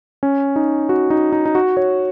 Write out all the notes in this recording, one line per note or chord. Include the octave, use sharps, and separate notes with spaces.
C#4
D#4
F#4
D#4
D#4
D#4
F#4
C#5